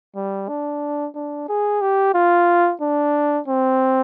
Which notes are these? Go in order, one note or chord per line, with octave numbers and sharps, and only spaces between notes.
G3
D4
D4
G#4
G4
F4
D4
C4